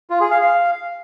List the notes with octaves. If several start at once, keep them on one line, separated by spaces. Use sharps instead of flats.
F4
G#4
F5
F5